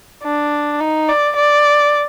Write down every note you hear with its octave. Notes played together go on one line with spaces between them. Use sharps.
D4
D#4
D5
D5